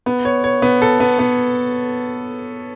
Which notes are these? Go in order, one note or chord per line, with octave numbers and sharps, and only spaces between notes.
B3
C#5
C#5
B3
A4
B3
B3